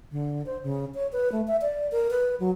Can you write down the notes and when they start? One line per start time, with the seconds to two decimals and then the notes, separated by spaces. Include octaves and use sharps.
0.12 D3
0.46 C5
0.63 C#3
0.95 C#5
1.13 B4
1.32 A3
1.48 E5
1.62 D5
1.92 A#4
2.11 B4
2.40 F#3